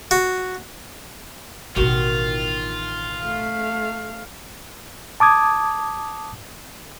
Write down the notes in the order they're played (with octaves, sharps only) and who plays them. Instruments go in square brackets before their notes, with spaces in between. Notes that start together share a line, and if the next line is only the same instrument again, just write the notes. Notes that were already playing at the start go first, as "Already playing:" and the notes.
[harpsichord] F#4
[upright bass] A1 B2 [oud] D#3 F#4 [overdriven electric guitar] F4
[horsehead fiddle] A3 F5
[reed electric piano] A5 D6 D#6 G#6